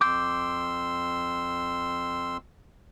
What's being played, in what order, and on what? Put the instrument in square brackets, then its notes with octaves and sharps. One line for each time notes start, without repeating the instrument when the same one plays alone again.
[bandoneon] F2 C6 E6 [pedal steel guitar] D6 G6